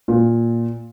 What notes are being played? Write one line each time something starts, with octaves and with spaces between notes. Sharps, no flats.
A#2